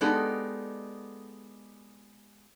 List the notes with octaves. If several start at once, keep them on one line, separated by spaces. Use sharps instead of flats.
G#3 B3 D#4 G4 A4 D5